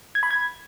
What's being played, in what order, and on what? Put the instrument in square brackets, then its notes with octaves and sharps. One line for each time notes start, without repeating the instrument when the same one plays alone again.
[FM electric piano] G#6
B5
G#6